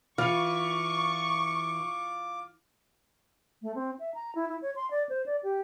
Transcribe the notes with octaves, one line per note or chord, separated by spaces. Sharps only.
E3 F4 C#6 D6
A3
C4
E5
A#5
E4
E4
C#5
C6
D5
C5
D5
G4